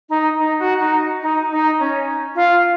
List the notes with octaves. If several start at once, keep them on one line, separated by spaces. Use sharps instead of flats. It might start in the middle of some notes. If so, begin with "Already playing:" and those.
D#4
D#4
F#4
D#4
D#4
D#4
C#4
F4